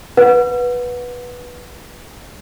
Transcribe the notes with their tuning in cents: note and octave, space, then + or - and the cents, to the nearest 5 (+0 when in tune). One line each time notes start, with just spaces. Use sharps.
B4 -10 F#5 -20